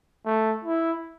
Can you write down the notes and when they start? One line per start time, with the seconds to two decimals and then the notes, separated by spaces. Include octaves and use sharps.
0.25 A3
0.64 E4